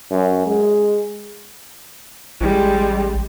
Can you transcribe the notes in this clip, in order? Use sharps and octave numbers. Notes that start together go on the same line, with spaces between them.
F#2
G#3
A1 G3 G#3